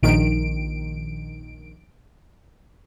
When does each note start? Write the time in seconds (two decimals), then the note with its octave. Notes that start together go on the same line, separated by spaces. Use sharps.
0.03 A#1 D#3 D7